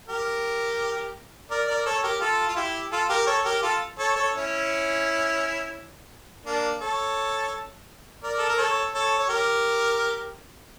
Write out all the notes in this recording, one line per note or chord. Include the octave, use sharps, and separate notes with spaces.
G4 A#4
A#4 D5
A#4 D5
A4 C#5
G4 A#4
F4 A4
F4
E4 G4
F4 A4
G4 A#4
A4 C#5
G4 A#4
F4 A4
A4 C#5
A4 C#5
C#4 E4
A#3 D4
A4 C#5
A#4 D5
A4
A#4
A4 C#5
A4 C#5
C#5
G4 A#4